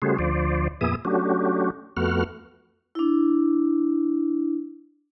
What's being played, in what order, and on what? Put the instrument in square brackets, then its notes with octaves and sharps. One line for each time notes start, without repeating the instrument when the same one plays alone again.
[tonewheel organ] C#3 G3 A3 F#4 G#4 C5
D2 F3 C5 D5
F2 A#2 B3 G#4 E5 D#6
F#3 A3 C#4 D4 F#4 G4
F2 A3 B3 F#4 F#5 F6
[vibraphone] D4 E4